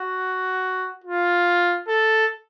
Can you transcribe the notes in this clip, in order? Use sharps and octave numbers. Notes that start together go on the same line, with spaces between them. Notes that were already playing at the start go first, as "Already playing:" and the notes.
Already playing: F#4
F4
A4